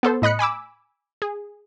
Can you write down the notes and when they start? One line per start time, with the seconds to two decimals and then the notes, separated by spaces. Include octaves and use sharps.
0.03 B3 A4 C5
0.22 A2 D#5 B5 F#6 C#7
0.39 G#5 B5 D6 E6
1.22 G#4